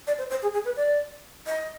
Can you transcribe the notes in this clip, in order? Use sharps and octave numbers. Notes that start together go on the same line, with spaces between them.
D5
C5
C5
G#4
G#4
B4
D5
D#5